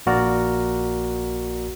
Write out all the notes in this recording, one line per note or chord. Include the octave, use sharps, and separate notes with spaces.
A#1 A#3 F#4 A#4 D5 A#5